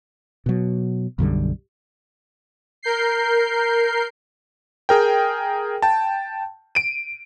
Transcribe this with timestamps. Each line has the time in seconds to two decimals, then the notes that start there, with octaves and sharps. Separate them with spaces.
0.46 B2 F#3
1.19 B1 F#2 D3 G3
2.83 A#4 G6 C7
4.89 G#4 A#4 G5
5.82 G5 A5
6.75 D7 D#7